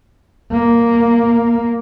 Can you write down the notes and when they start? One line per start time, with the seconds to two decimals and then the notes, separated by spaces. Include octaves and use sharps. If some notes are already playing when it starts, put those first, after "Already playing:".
0.52 A#3